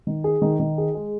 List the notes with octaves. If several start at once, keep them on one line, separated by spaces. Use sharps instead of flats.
D#3
G#4
D#3
D#3
G#4
G#3